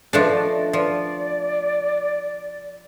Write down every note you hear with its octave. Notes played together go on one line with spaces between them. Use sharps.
F3 A3 D4 D5 D#5
F3 D5